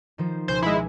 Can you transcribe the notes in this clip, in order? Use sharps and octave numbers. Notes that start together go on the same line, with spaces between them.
D#3 F3 C5
C#2 B2 C5 G#5
G#3 E4